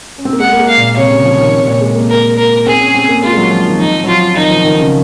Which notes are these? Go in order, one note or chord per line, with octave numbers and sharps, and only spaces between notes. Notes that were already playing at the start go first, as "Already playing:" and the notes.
C#4
C4
A#3
G#3 F#5
A#3
G#3
F5
A#2
C3 C#5
C#3
F3
D#3
C3
A#2
G#3
A#3
A#4
A#4
C4 G#4
C#4
C4
A#3
G#3 F4
G#3
F#3
F3
D#3
F3 D#4
F#3
F3 F4
D#3 D#4
F3
D#3
C#3